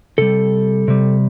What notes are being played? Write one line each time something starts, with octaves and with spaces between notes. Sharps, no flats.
C3 G3 A4
C3 G3